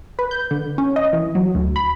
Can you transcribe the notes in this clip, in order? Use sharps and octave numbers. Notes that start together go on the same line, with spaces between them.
B4
G6
D3
C#4
D#5
E3
F#3
D2
B5